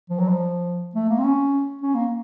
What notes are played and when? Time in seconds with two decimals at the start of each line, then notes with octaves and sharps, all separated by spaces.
0.09 F3
0.19 F#3
0.29 F3
0.95 A3
1.10 A#3
1.19 C4
1.24 C#4
1.81 C#4
1.95 A#3